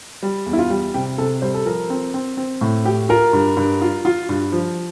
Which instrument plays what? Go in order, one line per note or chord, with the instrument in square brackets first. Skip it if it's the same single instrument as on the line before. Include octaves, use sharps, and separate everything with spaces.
[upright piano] G3
E2
[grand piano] E4
F4
[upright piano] G3
[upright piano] C3 [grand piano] G4
[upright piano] C3 [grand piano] A4
[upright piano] G3 [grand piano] C5
[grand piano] A4
[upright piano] F3 [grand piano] A#4
[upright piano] C4
C4
C4
A2
G4
[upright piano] F4 [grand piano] A#4
[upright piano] G2
G2
F4
F4
G2
F3